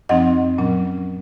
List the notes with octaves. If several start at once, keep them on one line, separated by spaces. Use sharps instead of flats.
F#2 F3 C4 D#4 D#5 F#5
A#2 F#3 C#4